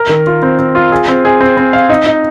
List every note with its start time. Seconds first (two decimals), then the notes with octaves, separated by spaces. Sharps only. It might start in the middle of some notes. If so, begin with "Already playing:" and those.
Already playing: A#4
0.09 D#3
0.27 F4
0.43 C4
0.59 C4
0.75 F4
0.92 G#4
1.08 C4
1.25 G#4
1.40 C4
1.57 C4
1.73 F5
1.89 D#4
2.06 D#4